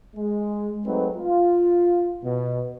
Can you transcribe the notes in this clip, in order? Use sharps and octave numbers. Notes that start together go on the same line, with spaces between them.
G#3
F#3 G#3 A3 C4 D#4 B4
F4
B2